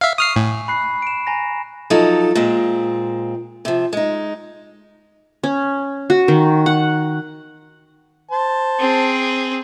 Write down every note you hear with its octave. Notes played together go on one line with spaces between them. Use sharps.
E5 F5
C#6 D#6 F6 C7
A2 G#5
B5 F#6 C7
D7 E7
G#5 A#5 A#6
F3 F#3 D#4 A4
A#2 G#3 C4
C3 F3
G#3 D#4
C#4
F#4
D#3
F#5
C5 A5
C4 G#4